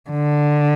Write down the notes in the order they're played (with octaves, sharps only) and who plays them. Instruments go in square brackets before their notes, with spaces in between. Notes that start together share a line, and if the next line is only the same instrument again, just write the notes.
[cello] D3